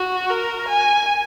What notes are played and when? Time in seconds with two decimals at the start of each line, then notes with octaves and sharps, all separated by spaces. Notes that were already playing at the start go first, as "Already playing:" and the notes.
Already playing: F#4
0.30 A#4
0.68 G#5